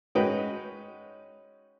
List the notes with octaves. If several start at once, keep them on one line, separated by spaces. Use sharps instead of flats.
G#3 C#4 D#4 F#4 B4 G5